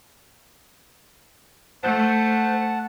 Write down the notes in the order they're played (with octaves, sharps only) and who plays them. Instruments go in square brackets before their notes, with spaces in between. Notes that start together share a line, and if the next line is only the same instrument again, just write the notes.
[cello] A3 [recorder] C5 [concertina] F#5 A5